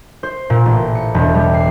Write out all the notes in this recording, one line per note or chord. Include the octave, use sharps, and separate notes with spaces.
C5
A#2
A1
C#7
E1
G3
C7